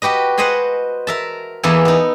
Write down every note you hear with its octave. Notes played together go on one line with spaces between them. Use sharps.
F#4 G4 B4 D#5
B4 C5 D#5 F#5 G#5 C6
A#4 E5 A5
E2 E3 A#3 B3 A4 G#5
B3 D#4